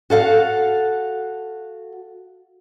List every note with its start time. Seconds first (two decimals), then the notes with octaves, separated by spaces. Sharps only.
0.10 F#4 A4 F5 F#5